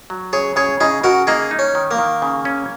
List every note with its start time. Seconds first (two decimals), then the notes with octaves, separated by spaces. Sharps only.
0.10 F#3
0.33 C#3 G#4 C#5
0.56 C#3 G#4 C#5
0.81 C#3 D#4 G#4
1.04 C#3 F#4 A#4
1.27 A#3 D#4 G#4
1.51 D#4
1.59 C#4
1.75 D#3
1.91 A#3
1.98 D#3
2.22 C#3
2.45 C#4